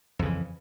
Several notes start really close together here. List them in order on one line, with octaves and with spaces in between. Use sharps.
F2 C#3 E3